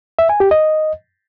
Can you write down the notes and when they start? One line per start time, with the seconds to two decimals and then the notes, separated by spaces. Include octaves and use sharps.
0.19 E5
0.29 G#5
0.40 G4
0.51 D#5